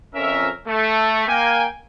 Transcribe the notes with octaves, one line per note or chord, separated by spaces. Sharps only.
F2 C#4 A#4 E5
A3
A#3 G5 G#5